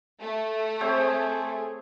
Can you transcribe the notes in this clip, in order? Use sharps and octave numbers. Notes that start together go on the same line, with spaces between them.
A3
C4 G#4 A4 C5 C#5